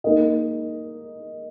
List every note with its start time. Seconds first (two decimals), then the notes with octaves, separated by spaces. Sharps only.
0.04 A#3 D#4 A#4 D#5